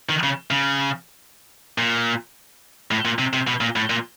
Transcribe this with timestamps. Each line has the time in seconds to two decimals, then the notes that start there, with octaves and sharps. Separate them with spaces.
0.09 D#3
0.23 C#3
0.51 C#3
1.78 A#2
2.91 A2
3.05 A#2
3.19 C3
3.33 C3
3.47 B2
3.61 A#2
3.76 A2
3.90 A#2